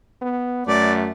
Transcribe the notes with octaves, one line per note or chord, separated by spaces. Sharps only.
B3
F#2 A3 D5